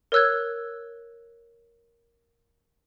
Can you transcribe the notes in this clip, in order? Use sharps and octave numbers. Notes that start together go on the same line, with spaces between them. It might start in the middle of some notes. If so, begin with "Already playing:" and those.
A#4 C#5 E6 F#6 G#6